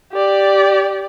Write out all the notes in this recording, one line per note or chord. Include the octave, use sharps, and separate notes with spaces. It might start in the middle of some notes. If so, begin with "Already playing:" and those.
G4 D5